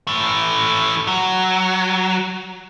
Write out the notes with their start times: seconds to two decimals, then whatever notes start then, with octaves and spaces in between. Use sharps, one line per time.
0.07 E3 A3
1.07 F#3